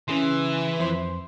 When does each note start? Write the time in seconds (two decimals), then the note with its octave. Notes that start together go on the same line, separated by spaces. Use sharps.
0.08 C#3 E3 G#4 C6
0.79 F2 C5 C6